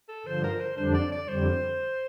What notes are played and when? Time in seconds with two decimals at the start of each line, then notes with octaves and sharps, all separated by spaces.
0.08 A4
0.26 G2 D3 F3 C5
0.43 A#4
0.60 C5
0.77 F2 D3 G3 D4 C5
0.94 D5
1.12 D5
1.29 F2 D3 G3 C5